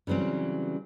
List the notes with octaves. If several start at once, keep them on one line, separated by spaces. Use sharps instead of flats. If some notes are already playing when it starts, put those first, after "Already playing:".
C#3 E3 F#3 G3 C4